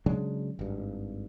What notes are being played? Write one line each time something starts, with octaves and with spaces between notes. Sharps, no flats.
C#3 F#3 G#3 D4
G#1 G2